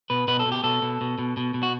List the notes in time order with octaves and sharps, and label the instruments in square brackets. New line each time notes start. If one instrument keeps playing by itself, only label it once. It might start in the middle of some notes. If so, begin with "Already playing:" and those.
[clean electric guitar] B2 B4
B2 B4
A4
B2
G4
B2 A4
B2
B2
B2
B2
B2
F#4